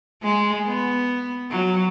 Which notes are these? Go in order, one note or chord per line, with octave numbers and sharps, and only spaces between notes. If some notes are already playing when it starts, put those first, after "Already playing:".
G#3
B3
F#3